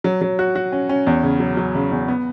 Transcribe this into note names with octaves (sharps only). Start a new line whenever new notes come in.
F#3
F#3
F#4
F#4
C#4
C#4
E2
C#3
F#3
F#3
C#3
E2
B3